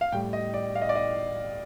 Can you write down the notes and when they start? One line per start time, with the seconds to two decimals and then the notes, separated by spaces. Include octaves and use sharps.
0.01 F5
0.12 A2 G3 G5
0.33 D#5
0.54 D5
0.75 F5
0.82 D#5
0.89 D5
0.96 D#5